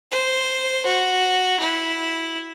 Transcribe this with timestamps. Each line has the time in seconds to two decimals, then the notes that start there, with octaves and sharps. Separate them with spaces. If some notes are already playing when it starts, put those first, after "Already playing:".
0.12 C5
0.86 F#4
1.60 E4